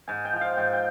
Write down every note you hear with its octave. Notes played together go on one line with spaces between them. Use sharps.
G#2 G#5
G5
F3
F5
G#2 G5
G5